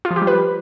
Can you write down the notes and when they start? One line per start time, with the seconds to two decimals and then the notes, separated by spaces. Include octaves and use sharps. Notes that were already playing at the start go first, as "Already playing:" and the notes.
0.05 F4
0.10 F3
0.16 G4
0.22 G3
0.27 B4